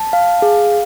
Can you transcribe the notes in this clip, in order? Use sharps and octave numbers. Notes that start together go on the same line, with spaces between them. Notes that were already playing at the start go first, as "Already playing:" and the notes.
Already playing: A5
F5
G#4